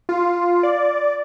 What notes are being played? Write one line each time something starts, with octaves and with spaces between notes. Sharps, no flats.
F4
D5